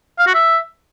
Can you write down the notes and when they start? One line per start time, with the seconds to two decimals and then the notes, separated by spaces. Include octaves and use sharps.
0.19 F5
0.27 F#4
0.34 E5